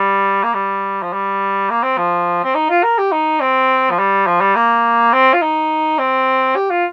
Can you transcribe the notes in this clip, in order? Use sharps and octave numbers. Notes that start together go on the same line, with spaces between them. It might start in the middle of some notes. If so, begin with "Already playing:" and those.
Already playing: G3
A#3
G3
F3
G3
A#3
C4
F3
C4
D#4
F4
A#4
G4
D#4
C4
F3
G3
F3
G3
A#3
C4
F4
D#4
C4
G4
F4